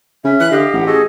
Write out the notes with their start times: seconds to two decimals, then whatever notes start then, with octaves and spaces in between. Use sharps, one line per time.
0.25 C#3 C#4 E5
0.40 E3 F#6
0.51 D3 G4 D#5 F5
0.73 A1 F#5
0.86 F#4 G#4 A4 D#5